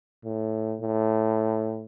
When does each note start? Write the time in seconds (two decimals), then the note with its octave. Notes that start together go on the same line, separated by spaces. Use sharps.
0.25 A2
0.82 A2